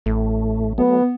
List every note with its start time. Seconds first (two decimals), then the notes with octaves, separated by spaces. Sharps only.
0.06 A1 A2 A3
0.78 F#3 A3 B3